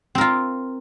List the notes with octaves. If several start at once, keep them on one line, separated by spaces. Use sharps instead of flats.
C4 F4 A#4